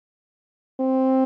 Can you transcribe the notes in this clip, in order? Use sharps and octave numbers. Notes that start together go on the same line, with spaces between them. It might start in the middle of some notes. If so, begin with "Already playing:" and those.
C4